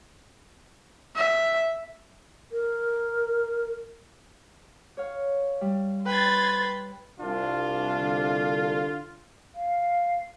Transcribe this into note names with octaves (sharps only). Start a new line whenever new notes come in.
E5
A#4
C#5 F5
G3
B4 G5 C6 G#6 A6
C2 D4 F4
D3
F5